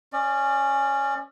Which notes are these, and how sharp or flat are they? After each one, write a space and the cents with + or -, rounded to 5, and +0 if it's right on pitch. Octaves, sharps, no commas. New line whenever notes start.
C#4 -5 D5 +25